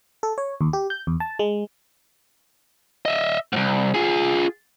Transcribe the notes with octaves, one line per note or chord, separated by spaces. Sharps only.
A4
C#5
D#2
G4
G6
E2
A5
G#3
D#5 E5
C2 G#2
F4 G#4